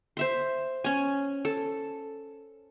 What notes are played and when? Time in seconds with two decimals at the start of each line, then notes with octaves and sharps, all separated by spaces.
0.17 C5 E5 C6
0.84 C#4 G#5
1.45 A4